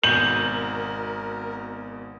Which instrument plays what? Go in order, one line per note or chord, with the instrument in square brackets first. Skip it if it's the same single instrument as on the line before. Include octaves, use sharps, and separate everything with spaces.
[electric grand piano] G#1 B2 [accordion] A#4 [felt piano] G6 [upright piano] F#7